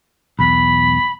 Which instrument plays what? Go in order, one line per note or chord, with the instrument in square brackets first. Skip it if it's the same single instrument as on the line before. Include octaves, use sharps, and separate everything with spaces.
[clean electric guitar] B1 E2 [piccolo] B5